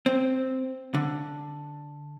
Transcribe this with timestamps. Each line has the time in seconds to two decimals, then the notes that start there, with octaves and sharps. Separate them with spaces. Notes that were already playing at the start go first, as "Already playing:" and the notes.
0.06 C4
0.94 D3